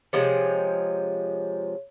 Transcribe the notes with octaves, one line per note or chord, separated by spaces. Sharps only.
C3 F3 G#3 C#5